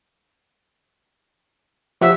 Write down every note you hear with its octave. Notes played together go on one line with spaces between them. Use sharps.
F3 G4 E5 F#5